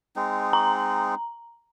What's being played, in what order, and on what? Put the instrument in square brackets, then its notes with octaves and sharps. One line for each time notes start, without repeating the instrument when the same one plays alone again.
[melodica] G#3 C4 D#4
[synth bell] A#5